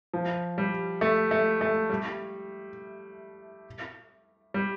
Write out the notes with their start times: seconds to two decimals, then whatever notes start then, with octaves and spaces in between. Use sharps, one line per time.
0.14 F3
0.58 G3
1.01 A3
1.31 A3
1.61 A3
1.90 G3
4.54 G3